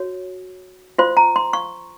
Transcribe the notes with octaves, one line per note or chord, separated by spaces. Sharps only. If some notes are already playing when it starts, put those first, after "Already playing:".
Already playing: F#4 C#5
F4 C5 C6
A#5
C6
C#6